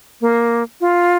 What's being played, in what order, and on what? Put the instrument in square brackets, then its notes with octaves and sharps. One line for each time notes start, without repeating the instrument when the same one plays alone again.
[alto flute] A#3
F4